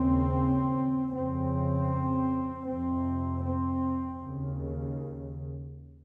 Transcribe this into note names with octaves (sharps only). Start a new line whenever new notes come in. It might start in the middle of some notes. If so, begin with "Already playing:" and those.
Already playing: D#2 C#3 C4
F2 C#3 C4
F2 C3 C4
C4
D#2 C#3